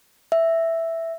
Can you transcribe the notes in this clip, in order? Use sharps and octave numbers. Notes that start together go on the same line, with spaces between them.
E5